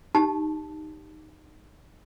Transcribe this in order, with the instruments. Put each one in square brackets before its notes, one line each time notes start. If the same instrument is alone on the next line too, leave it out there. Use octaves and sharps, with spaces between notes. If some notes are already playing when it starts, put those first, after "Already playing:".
[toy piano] D#4 G4 A5